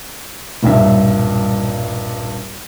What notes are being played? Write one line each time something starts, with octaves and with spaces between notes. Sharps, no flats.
D#1 B1 G2 E5